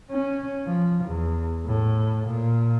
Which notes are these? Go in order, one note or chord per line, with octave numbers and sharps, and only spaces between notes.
C#4
F3
E2
A2
A#2